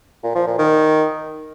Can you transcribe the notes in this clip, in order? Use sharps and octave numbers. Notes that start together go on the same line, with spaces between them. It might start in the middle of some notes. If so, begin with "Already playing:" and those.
A#2
F3
A#2
D#3